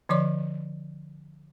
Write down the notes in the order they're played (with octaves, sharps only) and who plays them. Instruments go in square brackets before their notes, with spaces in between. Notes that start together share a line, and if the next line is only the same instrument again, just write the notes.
[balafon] D3 F3 C#5 D5 C6 D6